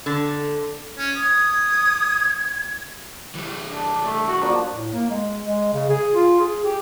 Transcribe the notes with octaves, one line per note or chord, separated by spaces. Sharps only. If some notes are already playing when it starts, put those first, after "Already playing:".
D3
C#4
D#6 G#6
E3 G3
D4
A3
F#4
F3 A#3 D4 F#4
A2
A#3
G#3
G#3
C#3
G#4
F4
G#4
G4